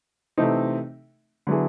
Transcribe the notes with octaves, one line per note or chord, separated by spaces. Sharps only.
C3 E3 A3 C4 D#4
D3 F#3 B3 E4 G#4